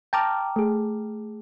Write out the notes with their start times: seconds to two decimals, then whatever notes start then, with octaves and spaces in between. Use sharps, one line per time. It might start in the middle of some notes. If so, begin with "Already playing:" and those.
0.13 G5 A5 A#5 D6 F6
0.56 A3 G#4